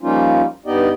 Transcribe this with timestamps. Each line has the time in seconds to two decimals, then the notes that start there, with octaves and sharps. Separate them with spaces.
0.01 F3 G3 A#3 C#4 D#4 F4
0.66 G2 B3 D#4 G4 D5 D#5